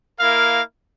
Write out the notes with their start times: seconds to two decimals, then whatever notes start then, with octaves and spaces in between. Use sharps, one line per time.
0.20 A#3 E4 A#4 F5